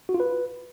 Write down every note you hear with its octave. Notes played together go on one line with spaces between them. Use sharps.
F#4
F4
B4